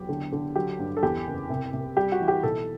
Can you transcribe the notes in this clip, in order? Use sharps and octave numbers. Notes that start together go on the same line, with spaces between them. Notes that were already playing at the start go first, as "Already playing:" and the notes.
Already playing: E2 F#3 G4
D3
D3
F#3 G4
G2
A4
E2 G4
F#1
C2
C2
G3 G4
F#4
E3
G4
B1 A4